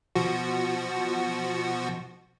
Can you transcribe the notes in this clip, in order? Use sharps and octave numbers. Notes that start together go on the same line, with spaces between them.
B2 F3 F#4